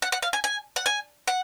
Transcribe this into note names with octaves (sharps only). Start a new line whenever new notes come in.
F#5
F#5
F5
G#5
G#5
F#5
G#5
F#5